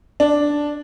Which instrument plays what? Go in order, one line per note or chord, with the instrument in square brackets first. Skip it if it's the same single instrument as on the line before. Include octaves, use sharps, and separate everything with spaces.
[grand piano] D4